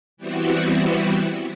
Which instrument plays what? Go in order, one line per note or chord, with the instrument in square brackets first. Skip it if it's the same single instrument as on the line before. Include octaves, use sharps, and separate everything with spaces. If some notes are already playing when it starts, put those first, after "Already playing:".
[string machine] E3 G3 B3 C4 E4 F#4